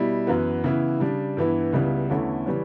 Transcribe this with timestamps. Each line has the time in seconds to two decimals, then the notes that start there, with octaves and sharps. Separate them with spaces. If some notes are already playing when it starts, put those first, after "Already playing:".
Already playing: B2 G3 E4
0.27 F#2 E3 B3
0.64 C#3 E3 B3 E4
1.00 C#3 G3 D4
1.37 G2 E3 B3 E4
1.73 C#2 C#3 G3 B3 E4
2.09 E2 D3 A3 C#4 E4
2.46 C#3 E3 G3 C#4